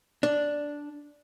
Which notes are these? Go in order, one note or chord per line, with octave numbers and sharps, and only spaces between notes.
D4